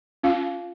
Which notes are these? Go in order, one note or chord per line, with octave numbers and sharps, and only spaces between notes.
C#4 F4 F5